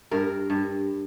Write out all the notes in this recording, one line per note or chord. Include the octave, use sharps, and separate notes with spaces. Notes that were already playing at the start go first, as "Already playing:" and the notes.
G2 A#4
G2